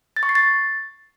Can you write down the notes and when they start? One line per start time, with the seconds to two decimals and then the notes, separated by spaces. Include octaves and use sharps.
0.16 A6
0.23 C#6
0.29 C7
0.35 A6